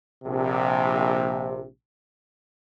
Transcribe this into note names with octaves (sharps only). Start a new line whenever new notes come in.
A#1 C3